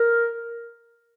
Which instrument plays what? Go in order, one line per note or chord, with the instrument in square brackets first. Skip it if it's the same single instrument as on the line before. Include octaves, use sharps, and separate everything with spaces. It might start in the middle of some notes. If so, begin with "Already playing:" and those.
Already playing: [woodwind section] A#4